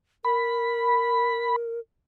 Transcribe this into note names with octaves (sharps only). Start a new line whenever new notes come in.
A#4 B5